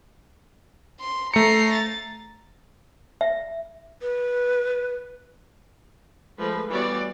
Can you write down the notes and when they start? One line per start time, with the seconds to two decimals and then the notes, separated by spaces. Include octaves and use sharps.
1.01 C6
1.34 A3 A#5 C7 C#7
1.74 A6
3.21 E5
4.02 B4
6.38 F3 G#3 A3 B4
6.70 E3 G3 B3 F#4 C#5 D5